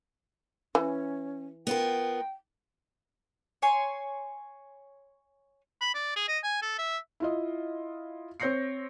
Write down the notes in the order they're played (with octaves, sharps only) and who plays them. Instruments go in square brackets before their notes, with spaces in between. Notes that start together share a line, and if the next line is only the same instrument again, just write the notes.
[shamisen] E3 [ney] C#4
[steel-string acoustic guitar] B3 F4 A#4 [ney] G5
[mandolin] C#5 G#5 C6
[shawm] B5
D5
G#4
D#5
G#5
A4
E5
[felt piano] E4 F4 D#5
C4 C#5 G6 A#6 C7 C#7